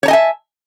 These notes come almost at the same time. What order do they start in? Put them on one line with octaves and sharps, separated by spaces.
C#5 A5 D#5 G#5 E5